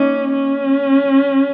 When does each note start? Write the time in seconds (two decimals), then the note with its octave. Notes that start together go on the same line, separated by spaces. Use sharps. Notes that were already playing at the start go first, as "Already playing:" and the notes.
Already playing: A#3 C#4 D#4
0.33 C#4